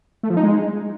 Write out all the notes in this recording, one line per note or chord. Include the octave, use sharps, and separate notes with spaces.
A3
F3
D#4
G#3